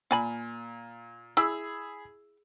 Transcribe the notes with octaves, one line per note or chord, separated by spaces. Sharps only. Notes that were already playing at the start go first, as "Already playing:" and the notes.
A#2 F5 G#5 B5
E4 G#4 B5 E6